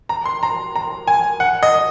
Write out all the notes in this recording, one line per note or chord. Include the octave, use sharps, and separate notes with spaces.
A#5
C6
A#5
A#5
G#5
F#5
D#5